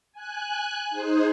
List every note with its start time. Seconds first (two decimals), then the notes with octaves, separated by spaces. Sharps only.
0.13 G#5 F#6
0.90 D#4 G#4 C5